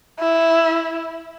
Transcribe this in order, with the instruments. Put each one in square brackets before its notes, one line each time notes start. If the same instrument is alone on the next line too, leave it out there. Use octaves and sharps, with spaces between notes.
[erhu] E4